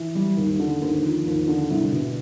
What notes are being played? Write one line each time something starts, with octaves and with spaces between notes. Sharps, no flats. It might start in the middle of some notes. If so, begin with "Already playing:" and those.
Already playing: E3
G3
D#2
D3
D#2
F3
D#2
D3
C2
B2